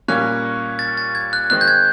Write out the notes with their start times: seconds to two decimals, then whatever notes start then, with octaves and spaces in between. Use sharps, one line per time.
0.08 A#2 G3 A#3 C#4 F#6
0.79 A6
0.97 A6
1.15 G#6
1.33 F#6
1.50 D#3 G#3 C4 F#6
1.61 G6
1.68 G#6